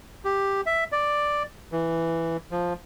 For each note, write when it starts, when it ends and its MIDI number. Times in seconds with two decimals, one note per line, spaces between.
0.25 0.61 67
0.66 0.84 76
0.92 1.43 74
1.72 2.37 52
2.51 2.73 53